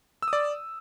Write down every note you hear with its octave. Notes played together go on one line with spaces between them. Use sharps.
E6
D#6
D5